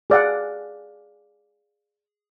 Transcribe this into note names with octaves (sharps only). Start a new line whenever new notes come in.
G#4 D5 F5 F#5